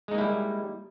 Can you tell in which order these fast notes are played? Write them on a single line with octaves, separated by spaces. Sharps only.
G#3 D#4 A#3 E4 G3